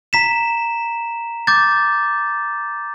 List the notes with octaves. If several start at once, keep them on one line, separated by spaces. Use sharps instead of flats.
A#5 B6 E7
D6 G6 A6